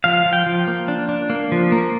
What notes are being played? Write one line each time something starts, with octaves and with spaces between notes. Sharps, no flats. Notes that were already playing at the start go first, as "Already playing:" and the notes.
F3 F5
F3
G5
F3
A#3
D4
D4
A#3
F3
A#3